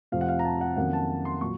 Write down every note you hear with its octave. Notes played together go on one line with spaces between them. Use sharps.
F2 C3 F3 A3 C4 F5
F#5
F5
A#5
A5
F#5
F2 D#3 F#3 A#3 C#4 F#5
A5
C6
A#2 F#3 C#6